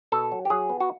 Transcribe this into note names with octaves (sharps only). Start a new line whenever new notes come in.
B2 A4
F#3
G4
F#3 G#4
B3
F#4